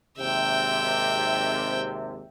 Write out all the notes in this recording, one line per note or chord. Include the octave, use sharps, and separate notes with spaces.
G#1 D#2 C3 E5 G5